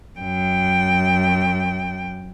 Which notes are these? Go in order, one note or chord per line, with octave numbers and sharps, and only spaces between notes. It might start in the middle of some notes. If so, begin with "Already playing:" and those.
F#2 G5